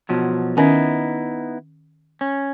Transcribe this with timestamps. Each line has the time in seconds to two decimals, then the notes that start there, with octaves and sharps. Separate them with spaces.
0.09 B2 F3 F#3
0.57 D#3 B3 C#4 D#4 E4
2.21 C#4